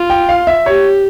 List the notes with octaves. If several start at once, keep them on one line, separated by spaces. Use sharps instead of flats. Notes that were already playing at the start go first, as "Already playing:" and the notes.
Already playing: F4
G5
F5
E5
G4 C#5